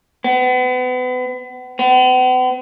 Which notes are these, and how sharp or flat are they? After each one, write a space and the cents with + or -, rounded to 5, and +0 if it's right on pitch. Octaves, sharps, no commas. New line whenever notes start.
B3 +35
B3 +45